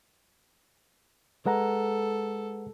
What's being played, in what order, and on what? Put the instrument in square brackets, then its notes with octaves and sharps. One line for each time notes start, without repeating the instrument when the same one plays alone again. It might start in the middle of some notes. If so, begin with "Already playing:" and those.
[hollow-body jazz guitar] G#3 [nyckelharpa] A4 [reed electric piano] B4 F#5 A#5